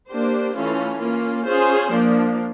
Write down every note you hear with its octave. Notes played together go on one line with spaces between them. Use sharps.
A#3 D4 G4 C5
E3 A3 C#4 F4
A#3 C#4 F4
C#4 F4 G#4 C5
F3 A#3 D4